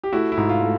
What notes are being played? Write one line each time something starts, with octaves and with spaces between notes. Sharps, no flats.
G4
A3 E4 F#4
E4
G#2
F4
A3